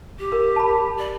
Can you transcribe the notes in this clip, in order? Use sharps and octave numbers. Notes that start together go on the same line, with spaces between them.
G4
A#4
A5 B5
D5